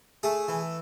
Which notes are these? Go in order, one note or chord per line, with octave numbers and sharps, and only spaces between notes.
A3 G#4
E3